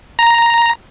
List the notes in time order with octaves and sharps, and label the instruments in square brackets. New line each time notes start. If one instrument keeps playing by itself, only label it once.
[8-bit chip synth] A#5